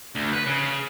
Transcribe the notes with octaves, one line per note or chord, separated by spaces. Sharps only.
D2
B4
C#3